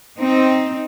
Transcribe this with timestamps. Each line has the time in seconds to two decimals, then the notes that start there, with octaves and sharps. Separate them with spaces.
0.18 C4 D#4